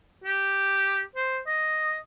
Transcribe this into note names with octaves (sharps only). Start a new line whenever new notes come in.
G4
C5
D#5